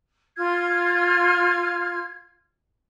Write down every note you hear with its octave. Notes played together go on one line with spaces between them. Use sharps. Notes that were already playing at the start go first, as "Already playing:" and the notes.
F4 F6 G#6